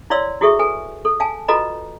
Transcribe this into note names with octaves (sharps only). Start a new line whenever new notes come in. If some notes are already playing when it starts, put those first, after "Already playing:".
E4 C#5 D5 F5 C6 E6
E4 F#4 G#4 A4 E5 C#6
A4 B4 G#5
A4
F5 G#5 A5
F4 F#4 A4 B4 D#5 A#5